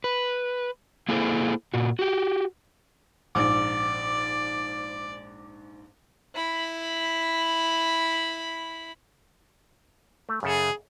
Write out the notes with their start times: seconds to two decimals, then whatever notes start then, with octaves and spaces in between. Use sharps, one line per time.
0.04 B4
1.09 A#3 E4 G#4 A4 C5
1.74 A#2 F#4
1.99 F#4 G4
3.35 A#1 G#2 D5 D6
6.35 E4 B5
10.29 A3
10.43 F#2 C#3 G#4 A4